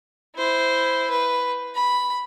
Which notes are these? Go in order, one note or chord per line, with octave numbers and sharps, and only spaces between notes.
E4 C5
B4
B5